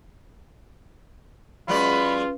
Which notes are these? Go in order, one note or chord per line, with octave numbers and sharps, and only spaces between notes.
F#3 G#3 C#4 F4 B4 D5 F5 B5